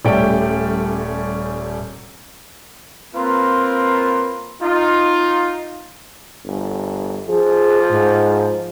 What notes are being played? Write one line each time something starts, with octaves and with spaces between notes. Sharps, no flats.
D#1 G3 A3 C#4 D5 G5
A#3 C4 F4 A#4 B4 C6
D#4 F4
G1
F3 G#4
G#2